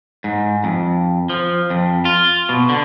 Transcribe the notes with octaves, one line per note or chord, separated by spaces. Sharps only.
G#2
F2
F3
F2
F4
B2
D3